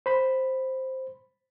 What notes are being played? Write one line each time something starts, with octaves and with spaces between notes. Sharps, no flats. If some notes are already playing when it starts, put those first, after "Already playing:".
C5 B5